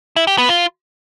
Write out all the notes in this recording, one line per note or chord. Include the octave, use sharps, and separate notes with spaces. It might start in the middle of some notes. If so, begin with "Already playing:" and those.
E4
G4
B3
F4